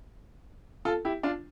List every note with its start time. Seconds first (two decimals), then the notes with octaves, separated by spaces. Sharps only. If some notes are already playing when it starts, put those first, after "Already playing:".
0.85 F4 A4
1.05 E4 G4
1.23 D4 F4